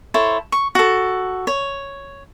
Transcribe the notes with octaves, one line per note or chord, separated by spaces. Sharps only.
E4 A4 C5 C#5
C#6
F#4 A4
C#5